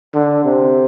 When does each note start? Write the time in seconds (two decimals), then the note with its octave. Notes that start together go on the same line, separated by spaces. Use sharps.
0.14 D3
0.45 C3